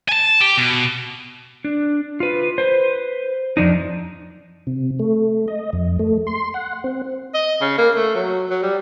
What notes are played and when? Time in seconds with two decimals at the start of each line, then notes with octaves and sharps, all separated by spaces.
0.09 G#5 A5
0.41 G4
0.57 B2
1.65 D4
2.20 F4 B4
2.58 B4 C5
3.57 F2 F3 D4 D#4
4.67 C3
4.99 A3
5.48 D#5
5.73 F2
5.99 A3
6.27 C6
6.54 F#5
6.84 C4
7.34 D#5
7.61 C#3
7.78 A#3
7.95 A3
8.15 F#3
8.49 F#3
8.63 G3